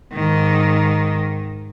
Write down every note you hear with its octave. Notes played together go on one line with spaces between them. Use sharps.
G#2 D#3